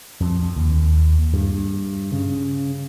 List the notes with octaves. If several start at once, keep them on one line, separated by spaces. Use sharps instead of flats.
F2
D#2
G2
C#3